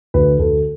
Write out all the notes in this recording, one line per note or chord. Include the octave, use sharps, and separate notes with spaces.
D2 B4
D2 A4